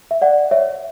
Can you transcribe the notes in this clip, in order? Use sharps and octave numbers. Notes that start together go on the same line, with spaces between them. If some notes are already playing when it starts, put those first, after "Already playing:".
E5
D5 F#5
C#5 E5